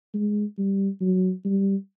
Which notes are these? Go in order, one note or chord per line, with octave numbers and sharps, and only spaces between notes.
G#3
G3
F#3
G3